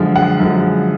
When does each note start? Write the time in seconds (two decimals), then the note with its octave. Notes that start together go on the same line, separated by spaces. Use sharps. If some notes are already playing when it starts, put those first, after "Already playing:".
Already playing: F#2 D3 F3 G#3
0.16 F#5
0.40 F#2 D3 F3 G#3